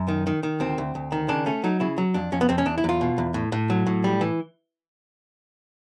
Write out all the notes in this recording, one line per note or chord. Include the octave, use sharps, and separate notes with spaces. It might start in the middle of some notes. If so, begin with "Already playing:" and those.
Already playing: F#2
D#3
D#3
D#3
D2 C4
D2
D2
D#3
C#3 D4
A3 C#4
F#3 D#4
C#3 E4
F#3
F2 D4
F2 C#4
B3
F2 C4
C#4
E2 D4
E4
E2 F4
B2
E2
A2
A2
F#3
A2
G3
E3